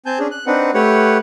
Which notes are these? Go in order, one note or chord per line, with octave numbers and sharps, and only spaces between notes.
C4 G#5 A5 G6
C#4 D4 G#4
F#6
C4 D4 D#4 B4 F#5
A3 G4 B4 C#5 F#5